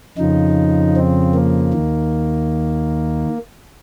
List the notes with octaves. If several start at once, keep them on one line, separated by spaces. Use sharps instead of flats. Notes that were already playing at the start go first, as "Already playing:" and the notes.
F2 C#3 F3 D#4
C4
A#3
D#2 D#3